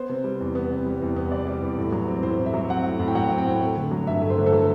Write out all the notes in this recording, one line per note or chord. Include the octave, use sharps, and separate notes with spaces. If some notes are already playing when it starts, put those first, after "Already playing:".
Already playing: B3 C5
C3
G3
E2
B3
C3
G3
E2
B3
C3 D5
G3
E2
A2
F#3
C4
A2 C5
A2
E5
F#3
C4 F#5
A2
A2
G5
F#3 F#5
C4
G5
A2
A3
D3
F#3
G2 E5
A3
C5
D3
A4
F#3 B4